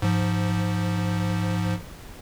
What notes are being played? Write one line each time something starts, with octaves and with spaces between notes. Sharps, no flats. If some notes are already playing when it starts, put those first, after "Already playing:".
G#2 F3